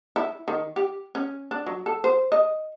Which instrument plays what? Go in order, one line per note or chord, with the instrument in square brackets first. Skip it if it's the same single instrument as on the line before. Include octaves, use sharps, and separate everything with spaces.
[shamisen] E4
D#3
G4
C#4
D4
F#3
A4
C5
D#5